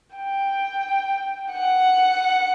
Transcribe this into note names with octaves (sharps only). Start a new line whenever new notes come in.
G5
F#5